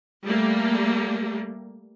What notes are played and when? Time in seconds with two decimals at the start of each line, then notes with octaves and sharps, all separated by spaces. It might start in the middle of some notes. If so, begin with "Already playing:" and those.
0.24 G3 A3 A#3